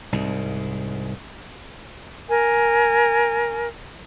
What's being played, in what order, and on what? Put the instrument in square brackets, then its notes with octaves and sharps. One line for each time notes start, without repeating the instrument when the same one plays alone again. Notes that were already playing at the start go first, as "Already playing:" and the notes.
[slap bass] C2 G#2
[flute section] A#4 G#5